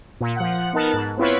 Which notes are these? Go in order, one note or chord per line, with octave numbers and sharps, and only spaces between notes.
A#2
F3 F#5
B3 D#4 A#4 A5 F#6
G#2
B3 C4 E4 F4 B4 C#5